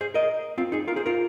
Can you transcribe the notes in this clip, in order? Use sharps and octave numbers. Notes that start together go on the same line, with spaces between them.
G#4 C5
A#4 D#5
C4 F4
D#4 G#4
F4 A#4
G#4 C5
F4 A#4